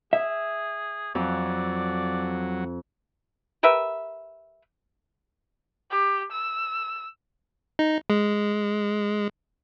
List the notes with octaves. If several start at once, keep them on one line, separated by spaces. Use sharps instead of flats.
G#4 E5
F2 F#3 D5
G4 A#4 B4 E5
G4
E6
D#4
G#3